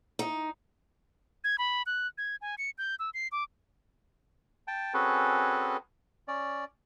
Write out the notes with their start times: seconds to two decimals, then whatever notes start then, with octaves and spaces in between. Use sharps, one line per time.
0.19 D#4
1.44 G#6
1.58 B5
1.86 F#6
2.18 G#6
2.41 G#5
2.58 C#7
2.78 G6
2.99 E6
3.14 C7
3.32 D6
4.68 G5 A5
4.94 C4 C#4 F#4 G#4 A4 B4
6.28 C#4 D5